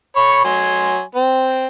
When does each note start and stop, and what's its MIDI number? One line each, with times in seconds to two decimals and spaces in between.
0.16 0.41 73
0.16 0.41 83
0.16 0.41 85
0.45 1.00 54
0.45 1.00 80
0.45 1.00 84
1.15 1.66 60